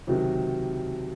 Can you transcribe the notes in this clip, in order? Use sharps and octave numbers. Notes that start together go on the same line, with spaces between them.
C#2 C3 D#3 F#3